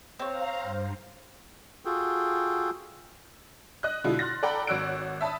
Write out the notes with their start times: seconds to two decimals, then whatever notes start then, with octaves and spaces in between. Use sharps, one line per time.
0.19 C4 C5 C#5 F5 A#5
0.62 G2
1.85 F4 F#4 G#4 A4 G5
3.83 D#5 F#6
4.04 B2 D3 G#3 E4 F4
4.19 C6 F6 F#6 A6 A#6
4.43 A4 D5 F#5 G5 A#5 B5
4.67 G#1 F#4 C#5 E6 F#6 D7
5.21 E5 A5 B5 D#6